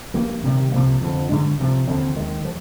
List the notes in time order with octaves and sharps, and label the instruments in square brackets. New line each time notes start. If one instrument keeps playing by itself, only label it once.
[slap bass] G2 F3 A#3
C3 D#3 G3
C2 C3 F3 A#3
F2 D3 F3
G2 D3 G#3 D4
D2 C3 F3
D#2 D3 F3 C4
D#2 D#3 G#3
F3